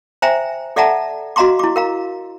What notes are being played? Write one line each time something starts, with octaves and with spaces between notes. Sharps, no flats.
C5 E5 G5 G#5 A#5
A4 D5 E5 F#5 A5 A#5
F#4 D#5 F5 A#5 C6 D6
E4 D6
A#4 F5 A#5